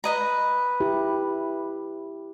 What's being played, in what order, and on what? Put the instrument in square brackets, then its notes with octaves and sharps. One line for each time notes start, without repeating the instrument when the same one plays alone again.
[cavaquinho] B4 D#5 A#5
[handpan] E4 G4